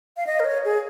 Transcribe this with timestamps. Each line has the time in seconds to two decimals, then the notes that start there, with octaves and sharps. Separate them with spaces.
0.17 F5
0.27 D#5
0.40 A#4
0.45 C#5
0.65 G#4